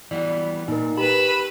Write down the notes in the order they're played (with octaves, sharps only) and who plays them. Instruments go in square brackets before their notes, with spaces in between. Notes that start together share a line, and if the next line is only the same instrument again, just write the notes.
[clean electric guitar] E3 G3 B3 [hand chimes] D5
[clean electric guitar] A#2 [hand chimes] D#4 A#4
[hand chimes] G4 [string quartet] B4 E6 [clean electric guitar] B5